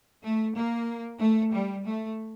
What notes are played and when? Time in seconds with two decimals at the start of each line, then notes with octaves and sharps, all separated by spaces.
0.23 A3
0.55 A#3
1.20 A3
1.53 G3
1.86 A3